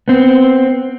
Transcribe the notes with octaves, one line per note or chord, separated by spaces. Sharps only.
B3 C4